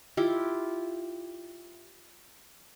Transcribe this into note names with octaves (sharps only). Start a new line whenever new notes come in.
E4 F4 G4